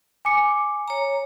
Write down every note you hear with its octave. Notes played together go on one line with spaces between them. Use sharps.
G#5 D6 C#7
C#5 A#5